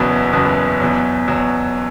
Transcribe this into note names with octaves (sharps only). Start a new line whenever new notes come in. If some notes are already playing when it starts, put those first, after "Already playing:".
Already playing: F#1 E2 B2 F#3 B3
F#1 E2 B2 F#3 B3
E2 B2 F#3
E2 B2 F#3